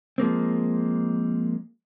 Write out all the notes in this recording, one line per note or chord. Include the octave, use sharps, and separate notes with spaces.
F3 G#3 A#3 C4